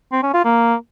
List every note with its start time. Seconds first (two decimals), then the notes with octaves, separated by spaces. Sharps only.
0.12 C4
0.23 C#4
0.34 F4
0.45 A#3